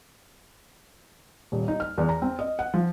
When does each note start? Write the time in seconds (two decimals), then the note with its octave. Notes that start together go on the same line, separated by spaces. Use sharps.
1.52 D#1
1.68 D#4
1.80 F6
1.98 E2
2.09 A#5
2.22 C4
2.39 D#5
2.59 F#5
2.74 F3